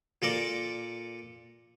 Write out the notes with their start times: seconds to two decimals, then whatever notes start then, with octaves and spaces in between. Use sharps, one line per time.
0.22 A#2 A4 A#4 D5